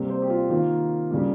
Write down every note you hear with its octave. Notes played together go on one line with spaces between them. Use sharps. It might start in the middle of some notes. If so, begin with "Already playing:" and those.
Already playing: C3 G3 A#3
C5
G4
F4
D#3 A#3 F4
C#3 G3 A#3